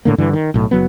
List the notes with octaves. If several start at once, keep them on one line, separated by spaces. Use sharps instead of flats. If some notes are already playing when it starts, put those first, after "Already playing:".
A2 D3 A#3
G2 D3 E3
D#3
B1 A2
F#1 F#3 B3